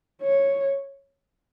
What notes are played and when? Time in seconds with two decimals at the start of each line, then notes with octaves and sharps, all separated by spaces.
0.22 C#5